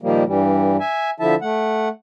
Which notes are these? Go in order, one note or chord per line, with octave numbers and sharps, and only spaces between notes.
A#2 D#3 F3 G3 A#3
G2 E3 G3
E5 G#5
D3 F3 E4 E5 A5
A3 F#5